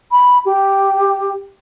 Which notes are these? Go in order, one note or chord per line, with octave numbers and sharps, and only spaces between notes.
B5
G4